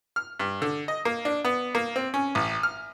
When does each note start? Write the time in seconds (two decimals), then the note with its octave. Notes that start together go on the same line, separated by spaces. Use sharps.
0.16 F6
0.40 G2
0.62 D3
0.88 D#5
1.05 A#3
1.25 D4
1.45 B3
1.75 A#3
1.96 C4
2.14 C#4
2.35 A1
2.63 F6